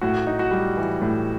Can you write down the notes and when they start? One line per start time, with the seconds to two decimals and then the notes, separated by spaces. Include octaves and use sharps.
0.01 A2 F#4
0.27 D#4
0.39 F#4
0.51 G3
0.77 E3
1.02 A2